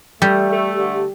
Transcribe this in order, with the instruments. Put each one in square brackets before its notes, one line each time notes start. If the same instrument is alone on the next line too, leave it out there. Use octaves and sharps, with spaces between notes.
[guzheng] G3 [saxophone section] A3
[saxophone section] A3
D3